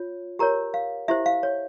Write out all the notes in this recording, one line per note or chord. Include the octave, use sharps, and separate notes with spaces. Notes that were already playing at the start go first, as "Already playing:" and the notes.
Already playing: F4 C#5
G4 A#4 C#5 A#5
F5
E4 G4 C5 E5
F5
C#5